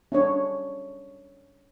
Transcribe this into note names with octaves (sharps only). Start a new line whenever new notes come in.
C#4 D4 C#5